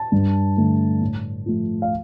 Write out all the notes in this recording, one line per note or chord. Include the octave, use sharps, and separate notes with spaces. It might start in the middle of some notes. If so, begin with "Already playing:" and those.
Already playing: A5
G2
D3 A3
A2
F3 A3
F5